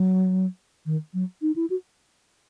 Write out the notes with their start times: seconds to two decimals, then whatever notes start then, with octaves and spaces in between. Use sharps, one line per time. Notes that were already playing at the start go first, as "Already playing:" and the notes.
Already playing: F#3
0.86 D#3
1.14 F#3
1.42 D#4
1.56 E4
1.70 F#4